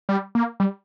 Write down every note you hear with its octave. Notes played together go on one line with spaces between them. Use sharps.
G3
A#3
G3